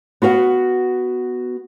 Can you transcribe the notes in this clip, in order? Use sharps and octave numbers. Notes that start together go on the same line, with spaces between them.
B3 F#4 F5 F#5